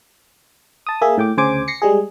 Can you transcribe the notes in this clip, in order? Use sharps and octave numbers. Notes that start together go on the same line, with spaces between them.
A5 D#6
A#3 G#4 E5
A2 G5 D6
D2 C#3 C5 G#5 D6
A#6 C7 C#7
G3 G#3 G#4